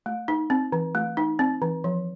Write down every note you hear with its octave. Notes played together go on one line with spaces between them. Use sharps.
A3
D#4
C4
E3
A3
D#4
C4
E3
F3